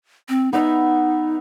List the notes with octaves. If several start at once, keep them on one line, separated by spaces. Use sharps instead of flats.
C4
B3 D#4 D#5 E5